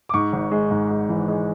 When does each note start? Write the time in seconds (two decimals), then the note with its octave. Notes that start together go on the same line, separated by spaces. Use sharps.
0.09 D6
0.14 G#2 C#6
0.33 G#1
0.52 G#3
0.71 G#2
0.90 G#3
1.09 E3
1.28 G#3